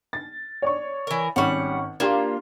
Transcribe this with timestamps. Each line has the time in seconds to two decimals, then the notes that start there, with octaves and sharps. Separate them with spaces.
0.13 A6
0.62 C#5 D5 C#6
1.07 E3 A#4
1.36 G#1 G3 C#4 F#5 C#6
2.00 A#3 D4 F4 G4 C6